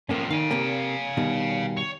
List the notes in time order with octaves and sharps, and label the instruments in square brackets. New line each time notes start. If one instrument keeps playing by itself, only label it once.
[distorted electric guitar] A2 F3 [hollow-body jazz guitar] A#3 C#4
[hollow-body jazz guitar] D#3 [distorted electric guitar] F5 G#5
[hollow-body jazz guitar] C3 A#3
B2 D#3 G3
[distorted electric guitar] C#5